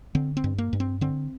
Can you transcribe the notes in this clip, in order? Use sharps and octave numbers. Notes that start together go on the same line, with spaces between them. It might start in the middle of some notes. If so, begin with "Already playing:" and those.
D3 C4
C4
G2
A#3
G2
C4
D3 C4